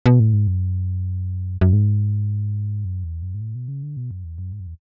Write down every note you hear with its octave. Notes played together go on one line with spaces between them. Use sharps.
B2
A2
G#2
F#2
F#2
G#2
F#2
E2
F#2
G#2
A2
B2
C#3
D3
B2
F#2
E2
F#2
G#2
F#2
E2